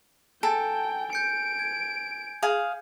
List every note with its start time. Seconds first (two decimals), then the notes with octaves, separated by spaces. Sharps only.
0.43 A4 G5 G#5 A6
1.13 G6 C#7 D7
1.59 G#6
2.43 G#4 F5